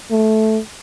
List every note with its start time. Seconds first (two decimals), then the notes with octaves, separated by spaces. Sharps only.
0.11 A3